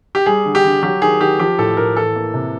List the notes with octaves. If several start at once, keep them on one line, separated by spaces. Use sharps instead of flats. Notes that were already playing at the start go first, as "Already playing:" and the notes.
G4
G3 G#4
D3
G4
D3
F#3 G4
D#3 G#4
D#3 G4
F3 G4
A2 A4
A2 A#4
E3 A4
A#3
C3